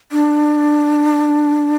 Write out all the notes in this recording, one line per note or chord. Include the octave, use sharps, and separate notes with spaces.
D4